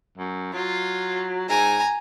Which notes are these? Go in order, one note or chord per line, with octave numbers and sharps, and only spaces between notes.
F#2
F#3 F4
G#2 G#5 A#5